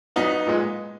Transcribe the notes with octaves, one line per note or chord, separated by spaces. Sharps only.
B1 B3 D#4
A#2 G#3